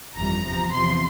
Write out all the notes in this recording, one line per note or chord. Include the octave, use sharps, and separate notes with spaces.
G1 F2 E3 G3 A#5
E2 C3 F3
E2 C3 F3 C6